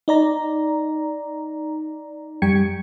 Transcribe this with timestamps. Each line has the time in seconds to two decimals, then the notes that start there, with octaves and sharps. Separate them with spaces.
0.08 D#4 D5 A#5
2.42 F#2 G3 G5 G#6 C#7